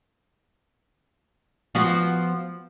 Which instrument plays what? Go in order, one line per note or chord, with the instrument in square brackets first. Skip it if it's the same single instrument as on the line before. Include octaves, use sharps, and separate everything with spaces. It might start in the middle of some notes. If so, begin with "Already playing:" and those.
[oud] F3 B3 F#4